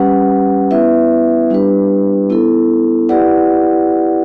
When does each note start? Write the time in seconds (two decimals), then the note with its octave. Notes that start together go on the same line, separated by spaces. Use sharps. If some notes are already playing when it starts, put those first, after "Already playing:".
Already playing: G3 C#4 G4 B4 F#5
0.71 B3 E4 B4 E5
1.50 G3 D4 G4 B4
2.30 B3 E4 A4
3.09 E4 G4 B4 D5 F#5